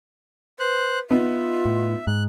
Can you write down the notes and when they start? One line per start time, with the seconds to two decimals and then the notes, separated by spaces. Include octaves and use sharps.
0.60 B4 C5 F#6
1.10 B3 D#4 F4 E5
1.65 A2
2.07 G#2 F#6